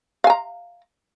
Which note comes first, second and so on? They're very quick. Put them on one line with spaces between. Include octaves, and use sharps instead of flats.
F5 G#5 A#5